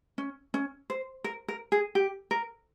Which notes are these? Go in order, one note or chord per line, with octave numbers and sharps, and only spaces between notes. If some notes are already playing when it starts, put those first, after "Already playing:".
C#4
C#4
C5
A#4
A#4
G#4
G4
A#4